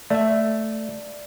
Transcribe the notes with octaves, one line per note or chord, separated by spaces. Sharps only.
A3 D5 E5